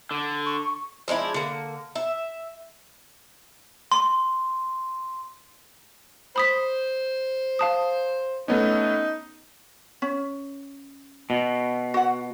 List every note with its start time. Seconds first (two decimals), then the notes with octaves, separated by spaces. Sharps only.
0.11 D3
0.46 C#6
1.08 F3 G#3 D4 E4
1.34 D3 A#3
1.95 E5
3.92 C6
6.36 C5 B5 D#6 B6
7.59 F5 A5 D#6
8.48 A3 B3 C#4 D#4
10.02 C#4
11.30 B2
11.94 F#4 F#5